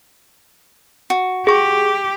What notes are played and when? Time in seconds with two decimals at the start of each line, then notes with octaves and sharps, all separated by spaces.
1.10 F#4
1.47 G4 G#4 C#6